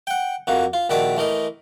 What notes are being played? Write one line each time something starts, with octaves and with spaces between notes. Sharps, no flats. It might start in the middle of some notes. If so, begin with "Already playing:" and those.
F#5 G5
F2 A#3 F#4
F4
A#1 D#3 F#4 D5 E5 A5
E3 A3 A#4 D#5